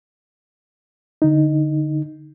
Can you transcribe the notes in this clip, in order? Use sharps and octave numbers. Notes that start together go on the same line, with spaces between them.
D3 D#4